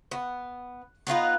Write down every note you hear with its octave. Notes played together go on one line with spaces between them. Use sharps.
B3
B3 D#4 F4 B4